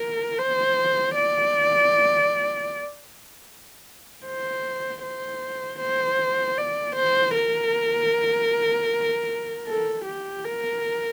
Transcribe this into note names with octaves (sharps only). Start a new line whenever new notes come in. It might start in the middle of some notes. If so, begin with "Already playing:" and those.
Already playing: A#4
C5
D5
C5
C5
C5
D5
C5
A#4
A4
G4
A#4